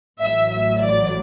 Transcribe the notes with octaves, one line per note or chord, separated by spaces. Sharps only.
A1 A2 F#3 E5
E5
D5